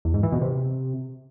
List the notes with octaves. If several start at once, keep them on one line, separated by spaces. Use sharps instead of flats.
E2
G#2
E3
B2
C3